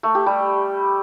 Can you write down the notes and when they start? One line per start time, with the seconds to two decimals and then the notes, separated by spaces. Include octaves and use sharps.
0.03 A3
0.15 G4
0.26 G3